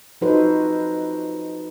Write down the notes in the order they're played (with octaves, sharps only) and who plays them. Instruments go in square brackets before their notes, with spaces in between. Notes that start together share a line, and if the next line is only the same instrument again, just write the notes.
[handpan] F3 D#4 F#4 A4 B4 C5